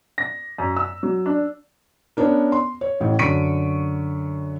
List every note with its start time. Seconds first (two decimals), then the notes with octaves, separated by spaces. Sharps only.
0.18 A#6
0.58 F#2
0.77 E6
1.03 F#3
1.26 D4
2.17 B3 C#4 D4 A#4
2.52 C6
2.81 C#5
3.00 A1 A2
3.19 F#2 D3 C#6 B6 D7 D#7